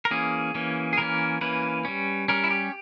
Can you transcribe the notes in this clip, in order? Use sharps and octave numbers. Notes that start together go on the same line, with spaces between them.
A#4
E3 A#3 C#4 G#4
E3 A#3 C#4
G#4
E3 A#3 C#4 A#4
E3 A#3 C#4 B4
G3 C#4
G3 C#4 A#4
E4
G4